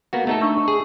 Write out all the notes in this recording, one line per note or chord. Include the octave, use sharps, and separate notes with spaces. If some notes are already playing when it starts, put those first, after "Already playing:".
A#3 B3 F#4
A3 D#4 A4
D4 C#6 E6
G#4